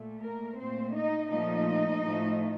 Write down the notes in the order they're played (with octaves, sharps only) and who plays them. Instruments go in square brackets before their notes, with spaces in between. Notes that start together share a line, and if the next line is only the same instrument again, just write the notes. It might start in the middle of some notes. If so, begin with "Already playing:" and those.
Already playing: [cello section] A#2 A3
A#3 A#4
A#2 A3 C4 C5
D#4 D#5
A#2 F3 A3 D#4 D#5
A2 F3 A3